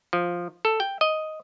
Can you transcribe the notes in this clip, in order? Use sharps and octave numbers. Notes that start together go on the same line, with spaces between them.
F3
A4
G5
D#5